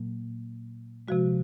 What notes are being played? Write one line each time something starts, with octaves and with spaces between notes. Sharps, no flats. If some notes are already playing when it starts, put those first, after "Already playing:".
Already playing: A#2 F#3 A#3
C3 F3 G#3 F#4